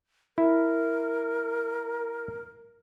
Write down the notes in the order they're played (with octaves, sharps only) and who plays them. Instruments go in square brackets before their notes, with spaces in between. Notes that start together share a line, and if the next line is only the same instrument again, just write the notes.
[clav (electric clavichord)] E4 [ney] A#4